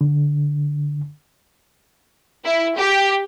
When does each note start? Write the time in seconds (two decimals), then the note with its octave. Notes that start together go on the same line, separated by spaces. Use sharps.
0.01 D3
2.44 E4
2.77 G4